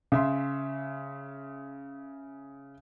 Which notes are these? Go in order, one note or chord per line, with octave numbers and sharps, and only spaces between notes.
C#3 E5 C6